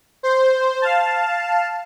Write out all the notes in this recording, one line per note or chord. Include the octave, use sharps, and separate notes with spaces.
C5
F5 A5